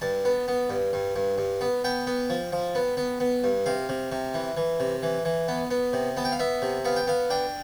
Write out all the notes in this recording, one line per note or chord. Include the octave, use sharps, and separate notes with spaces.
G2 A5
B3
B3
G2
G2
G2
G2
B3
B3 G5
B3
F3
F3
B3
B3
B3
G2
C3 F5
C3
C3
E3
E3
C3
E3
E3
B3
B3
C3
B3 A5
G5
F5
B3 E5
C3
B3 F5
G5
B3 F5
D4 G5